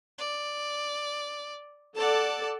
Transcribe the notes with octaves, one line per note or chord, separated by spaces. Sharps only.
D5
A4 D5 F#5 A5